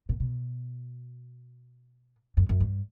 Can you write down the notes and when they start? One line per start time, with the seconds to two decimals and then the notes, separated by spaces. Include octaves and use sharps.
0.09 A#2
0.20 B2
2.37 F#2
2.49 F#2
2.60 G2